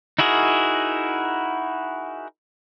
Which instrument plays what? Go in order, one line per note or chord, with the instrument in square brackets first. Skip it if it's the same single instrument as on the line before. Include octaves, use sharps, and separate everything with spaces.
[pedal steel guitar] D#4 E4 F#4 G#4 A#4